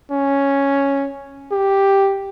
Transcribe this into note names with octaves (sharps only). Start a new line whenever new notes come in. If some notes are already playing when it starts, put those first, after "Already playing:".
C#4
G4